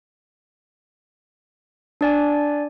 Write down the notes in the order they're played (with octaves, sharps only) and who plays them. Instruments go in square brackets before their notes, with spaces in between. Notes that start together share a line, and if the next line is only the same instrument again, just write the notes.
[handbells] D4 D5 G#5